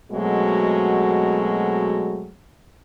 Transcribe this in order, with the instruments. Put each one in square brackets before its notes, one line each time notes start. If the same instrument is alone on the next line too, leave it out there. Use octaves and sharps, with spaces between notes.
[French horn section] B2 F#3 G#3 A3 C4